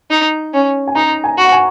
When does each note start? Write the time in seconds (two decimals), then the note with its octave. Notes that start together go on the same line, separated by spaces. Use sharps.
0.11 D#4
0.53 C#4
0.87 G#5
0.95 D#4 A#5
1.24 G#5
1.38 F#4
1.44 F#5
1.52 G#5